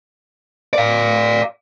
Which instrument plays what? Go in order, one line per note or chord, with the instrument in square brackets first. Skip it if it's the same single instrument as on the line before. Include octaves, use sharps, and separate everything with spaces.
[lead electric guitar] D5 F5